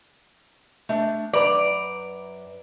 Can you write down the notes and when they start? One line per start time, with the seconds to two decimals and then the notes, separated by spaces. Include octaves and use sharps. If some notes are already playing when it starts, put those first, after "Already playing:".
0.89 A3 D4
1.33 F#2 B4 D5 A#5